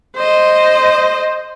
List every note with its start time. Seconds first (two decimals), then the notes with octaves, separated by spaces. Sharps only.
0.16 C5 D#5